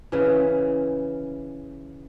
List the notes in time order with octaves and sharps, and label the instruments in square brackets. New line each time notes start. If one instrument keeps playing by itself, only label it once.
[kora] C#3 E3